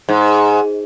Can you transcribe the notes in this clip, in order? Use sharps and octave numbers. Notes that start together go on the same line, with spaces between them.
G#2